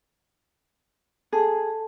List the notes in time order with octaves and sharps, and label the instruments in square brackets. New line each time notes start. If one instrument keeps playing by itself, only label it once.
[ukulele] G#4 [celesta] A4 A5